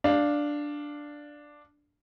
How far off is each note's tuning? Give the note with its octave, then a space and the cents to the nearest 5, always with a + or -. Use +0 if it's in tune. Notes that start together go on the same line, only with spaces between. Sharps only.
D4 +0 F5 +0